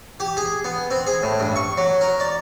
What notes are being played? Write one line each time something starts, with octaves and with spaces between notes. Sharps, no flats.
G4
G#4
B3
C4
G#4
A2
G2
C#6
F#3
A#4
D5